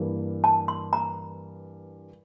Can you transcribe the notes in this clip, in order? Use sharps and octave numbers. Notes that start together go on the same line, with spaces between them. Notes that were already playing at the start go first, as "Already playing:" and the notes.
Already playing: G2 E3 A#3
A5
C6
A#5